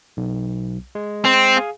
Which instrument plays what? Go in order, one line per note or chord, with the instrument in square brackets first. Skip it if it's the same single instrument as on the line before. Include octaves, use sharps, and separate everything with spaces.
[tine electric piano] B1
G#3
[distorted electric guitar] C4
[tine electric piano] G#4 F5 G#5